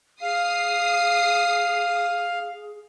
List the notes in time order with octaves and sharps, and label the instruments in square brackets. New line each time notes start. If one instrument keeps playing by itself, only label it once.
[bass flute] G#4 [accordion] F5 [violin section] D#6 C7